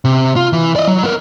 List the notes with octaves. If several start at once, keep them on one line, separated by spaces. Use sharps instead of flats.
C3
F4
E3
D5 D#5
F#3
B3 A#4